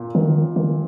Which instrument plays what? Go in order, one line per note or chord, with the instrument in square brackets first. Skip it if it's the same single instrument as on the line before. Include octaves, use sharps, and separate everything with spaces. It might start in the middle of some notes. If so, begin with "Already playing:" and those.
Already playing: [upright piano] A#2
[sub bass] D#3
D#3